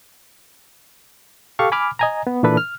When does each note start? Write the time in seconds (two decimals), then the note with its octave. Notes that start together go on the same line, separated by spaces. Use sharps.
1.59 G4 A4 F5 C#6
1.72 G#5 B5 D6 F6
1.99 D#5 G#5 A#5
2.27 B3
2.43 A#2 E3 D4 A4 B4
2.57 F6